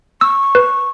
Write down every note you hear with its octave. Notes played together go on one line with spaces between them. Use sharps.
C#6 E6
B4